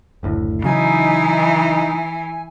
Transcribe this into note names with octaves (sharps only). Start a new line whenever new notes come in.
F#1 D2 A2
C#3 E3 F#3 D#4 G#5